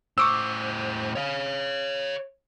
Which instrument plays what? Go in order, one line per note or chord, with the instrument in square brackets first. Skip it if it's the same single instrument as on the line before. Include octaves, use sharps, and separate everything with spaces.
[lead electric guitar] A2 C5 [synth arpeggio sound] C#6 D6 E6
[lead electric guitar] C#5 F5